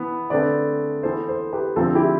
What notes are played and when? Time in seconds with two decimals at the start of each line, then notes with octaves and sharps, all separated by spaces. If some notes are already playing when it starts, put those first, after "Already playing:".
Already playing: E3 B3
0.30 D3 A3 C4 B4 D5
1.03 E3 B3 A4 C5
1.28 A4 C5
1.53 G4 B4
1.76 D3 F3 A3 C4 F4 A4
1.95 E4 G4